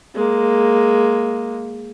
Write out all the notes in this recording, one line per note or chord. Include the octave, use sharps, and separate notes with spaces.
G#3 A#3